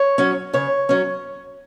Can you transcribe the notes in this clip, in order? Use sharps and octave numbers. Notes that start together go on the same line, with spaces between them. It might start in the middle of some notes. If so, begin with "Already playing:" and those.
Already playing: C#5
F#3 C#4
C#3 C#5
F#3 C#4